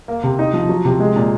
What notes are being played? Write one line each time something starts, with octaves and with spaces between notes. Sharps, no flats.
A#3
C3
D#4
F3
F#3
C3
G#3
A#2